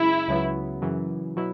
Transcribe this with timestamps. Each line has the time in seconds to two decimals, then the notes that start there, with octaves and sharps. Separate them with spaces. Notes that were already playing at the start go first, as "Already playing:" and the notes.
Already playing: F#2 C#3 G#3 E4
0.27 C#2 C#3 F#3 B3
0.82 F#2 C#3 E3
1.37 B2 F#3 E4